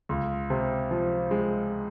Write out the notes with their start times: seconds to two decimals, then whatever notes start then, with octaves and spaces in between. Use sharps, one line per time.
0.09 C#2
0.50 C3
0.91 F3
1.31 G#3